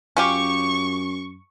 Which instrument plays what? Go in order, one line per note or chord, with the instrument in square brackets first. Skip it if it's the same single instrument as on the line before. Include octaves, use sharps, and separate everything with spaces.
[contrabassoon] F#2 [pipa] C#4 F4 G4 [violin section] C#6